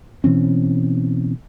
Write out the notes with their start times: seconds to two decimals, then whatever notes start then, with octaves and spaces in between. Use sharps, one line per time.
0.24 B2 E3 C4 C#4